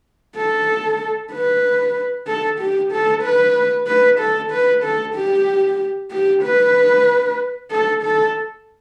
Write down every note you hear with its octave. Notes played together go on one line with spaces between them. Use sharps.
A4
B4
A4
G4
A4
B4
B4
A4
B4
A4
G4
G4
B4
A4
A4